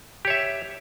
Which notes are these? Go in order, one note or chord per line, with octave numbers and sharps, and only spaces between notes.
G4 C#5 E5